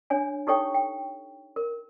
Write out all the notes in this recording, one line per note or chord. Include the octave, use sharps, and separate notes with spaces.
D4 C#5 G#5
D#4 G4 A4 C#5 G5 C#6
G5
A#4